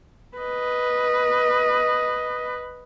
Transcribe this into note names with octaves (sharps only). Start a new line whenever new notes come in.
B4 D#5